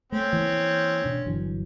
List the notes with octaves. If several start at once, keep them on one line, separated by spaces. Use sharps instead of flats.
A3 C4 C#4
E3 A#3
B2 D4
G1 E3 F#3